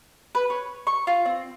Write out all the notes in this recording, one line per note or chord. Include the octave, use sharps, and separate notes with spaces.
B4
C#5
C#6
F4
C4